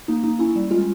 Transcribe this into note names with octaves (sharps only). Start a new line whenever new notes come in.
A#3 D#4
A#3 D#4
C#4 E4
G3
G#3 F4